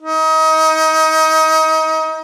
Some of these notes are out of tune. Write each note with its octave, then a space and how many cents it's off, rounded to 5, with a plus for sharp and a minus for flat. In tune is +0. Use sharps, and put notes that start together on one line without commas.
D#4 +30